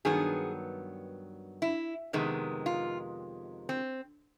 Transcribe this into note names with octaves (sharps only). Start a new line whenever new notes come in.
G2 D#3 F#3 B3 G#4
E4
F2 C3 D#3 G#3 B3
F4
C4